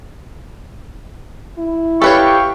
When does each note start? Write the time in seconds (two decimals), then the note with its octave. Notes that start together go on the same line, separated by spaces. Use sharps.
1.58 E4
2.02 G4 A4 B4 C#5 F5 G5 C#6